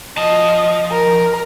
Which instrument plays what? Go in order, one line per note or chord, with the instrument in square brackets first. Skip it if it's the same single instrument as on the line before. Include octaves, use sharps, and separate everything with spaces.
[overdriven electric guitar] F3 A5 [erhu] D#5
[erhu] A#4